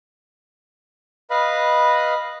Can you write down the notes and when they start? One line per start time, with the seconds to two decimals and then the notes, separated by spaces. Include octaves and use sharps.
1.30 B4 D#5 F5 B5